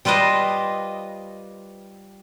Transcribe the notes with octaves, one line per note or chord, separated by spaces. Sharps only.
G3 F4 B4 C5 D#5